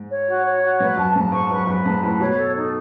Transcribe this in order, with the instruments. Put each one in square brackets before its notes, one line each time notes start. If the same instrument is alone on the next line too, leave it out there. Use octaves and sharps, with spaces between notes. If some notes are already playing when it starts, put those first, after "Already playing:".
Already playing: [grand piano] G#2
[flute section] C#5
F#4
C#5
F#4
[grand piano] G#2 [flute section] B4
[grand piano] F#2 [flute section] A5
[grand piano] G#2 [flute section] A5
[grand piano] G#2 [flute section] C#6
[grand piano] F#2 [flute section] B4
[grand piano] F#2 [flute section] B4
[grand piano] G#2 [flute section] A5
[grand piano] A2 [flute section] B4
[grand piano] B2 [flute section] C#5
[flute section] A4
D#4